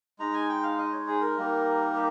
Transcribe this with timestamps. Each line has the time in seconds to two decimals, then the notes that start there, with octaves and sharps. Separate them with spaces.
0.19 G#3 D#4 A#5
0.33 G#5
0.49 G5
0.63 F5
0.78 D#5
0.92 C#5
1.07 G#4
1.21 A#4
1.37 G3 A#3 D#4
1.95 G4